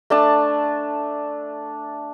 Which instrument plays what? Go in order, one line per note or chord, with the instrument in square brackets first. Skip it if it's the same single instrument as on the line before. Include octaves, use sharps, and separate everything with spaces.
[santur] A3 D4 A5